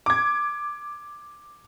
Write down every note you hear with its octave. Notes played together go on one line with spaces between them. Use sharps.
D6 G#6